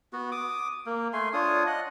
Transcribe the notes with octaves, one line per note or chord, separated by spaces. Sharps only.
B3 F#4
D6 D#6
A#3
A3 G#5 C6
D4 F4 C#5 D#6
D#5 F#5